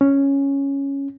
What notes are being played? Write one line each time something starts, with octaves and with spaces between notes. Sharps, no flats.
C#4